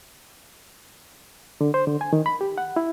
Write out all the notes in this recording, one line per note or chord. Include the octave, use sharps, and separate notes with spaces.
D3
C5
D3
G#5
D#3
B5
G4
F#5
E4